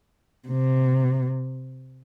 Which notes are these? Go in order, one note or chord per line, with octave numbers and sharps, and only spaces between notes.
C3